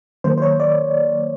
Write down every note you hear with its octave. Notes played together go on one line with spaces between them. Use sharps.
D#3 F#3 A#3 C5
C5
C#5
D5